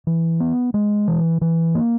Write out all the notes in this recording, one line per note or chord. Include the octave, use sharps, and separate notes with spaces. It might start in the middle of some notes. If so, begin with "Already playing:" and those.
E3
B3
G#3
E3
E3
A#3